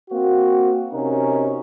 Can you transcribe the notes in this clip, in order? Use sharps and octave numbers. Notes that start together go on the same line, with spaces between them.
A#3 C4 F#4
C3 C#4 D#4 F#4 A#4